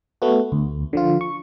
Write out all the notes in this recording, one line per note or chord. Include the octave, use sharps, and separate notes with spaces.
A3 B3 F#4
D2
D3 F3 F4
C#6